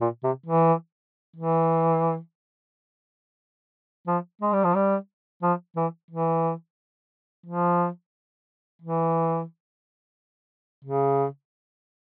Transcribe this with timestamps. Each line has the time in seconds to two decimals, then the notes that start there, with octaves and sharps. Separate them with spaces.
0.01 A#2
0.24 C3
0.46 E3
1.36 E3
4.07 F3
4.41 G#3
4.53 G3
4.64 F3
4.75 G3
5.43 F3
5.76 E3
6.11 E3
7.46 F3
8.82 E3
10.85 C#3